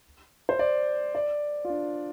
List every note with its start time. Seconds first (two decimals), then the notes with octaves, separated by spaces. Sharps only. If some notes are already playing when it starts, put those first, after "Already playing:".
0.49 C5
0.59 D5
1.15 D5
1.65 F4
1.70 D4